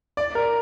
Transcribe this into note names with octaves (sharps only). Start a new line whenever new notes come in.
D5
A#4